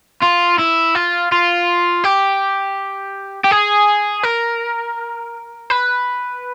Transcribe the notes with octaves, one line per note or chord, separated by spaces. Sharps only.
F4
E4
F4
F4
G4
G4
G#4
A#4
B4